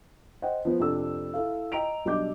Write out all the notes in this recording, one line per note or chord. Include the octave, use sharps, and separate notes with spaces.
C5 D#5 F#5 G5
F3 B3 C5
F2 C3 D4 A4 E6
E4 A4 F5
D#5 G5 A#5 D7 F7
B1 G3 D4 D#5 D6 G6